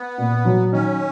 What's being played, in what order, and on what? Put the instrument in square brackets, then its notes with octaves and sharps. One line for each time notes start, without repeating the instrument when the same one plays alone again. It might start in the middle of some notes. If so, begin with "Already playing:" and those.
Already playing: [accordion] B3
[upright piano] A#2
F#3
[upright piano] D#3 [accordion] C#4